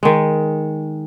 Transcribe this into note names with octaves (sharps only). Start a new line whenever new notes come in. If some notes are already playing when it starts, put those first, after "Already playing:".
D#3 G#3